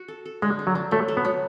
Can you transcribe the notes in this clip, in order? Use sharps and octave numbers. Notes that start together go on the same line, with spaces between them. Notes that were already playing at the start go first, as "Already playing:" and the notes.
Already playing: F#4
A4
A4
D3 G#3
D4
F#3
D4
F#3 A3
A3
B3
F#3